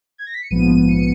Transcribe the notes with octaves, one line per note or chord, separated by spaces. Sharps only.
G#6
A#6
B6
C#7
A#1 G#2 F3 B3 D#7
D#7
C#7